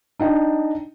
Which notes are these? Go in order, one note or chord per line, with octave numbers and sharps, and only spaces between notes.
D4 D#4 G5